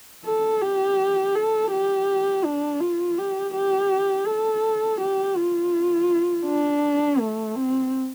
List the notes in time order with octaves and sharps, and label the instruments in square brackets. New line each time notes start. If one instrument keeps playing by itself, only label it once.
[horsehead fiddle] A4
G4
A4
G4
D4
F4
G4
G4
A4
G4
F4
D4
A3
C4